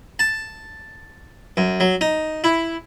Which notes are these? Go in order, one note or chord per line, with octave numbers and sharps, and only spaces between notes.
A5
F#2
F#3
D#4
E4